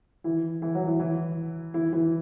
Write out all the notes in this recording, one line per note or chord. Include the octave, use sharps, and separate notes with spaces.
E3 E4
E3 E4
F#3 F#4
E3 E4
E3 E4
E3 E4
E3 E4